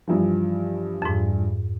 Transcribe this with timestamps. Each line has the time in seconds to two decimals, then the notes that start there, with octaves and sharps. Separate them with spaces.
0.08 G2 E3 F3
1.02 F2 G#2